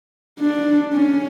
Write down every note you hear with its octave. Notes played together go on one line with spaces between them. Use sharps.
D4
C#4